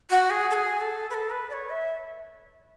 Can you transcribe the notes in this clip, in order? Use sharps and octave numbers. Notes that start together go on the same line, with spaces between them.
F#4
G#4
A4
G#4
A4
B4
A4
B4
D5
C#5
E5